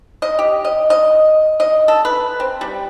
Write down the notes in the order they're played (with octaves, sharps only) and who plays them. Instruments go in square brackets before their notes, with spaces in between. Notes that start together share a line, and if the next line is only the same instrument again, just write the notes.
[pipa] D#5
G4
D#5
D#5
D#5
A4
B4
C4
G3